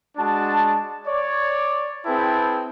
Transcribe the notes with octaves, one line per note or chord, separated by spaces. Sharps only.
G#3 D4 F#4 A5
C#5 D5
C4 E4 G#4 B4 G5 A5